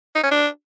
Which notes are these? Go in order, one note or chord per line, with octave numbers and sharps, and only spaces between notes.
D#4
C#4
D4